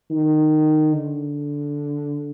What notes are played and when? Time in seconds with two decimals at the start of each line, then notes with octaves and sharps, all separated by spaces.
0.10 D#3
0.93 D3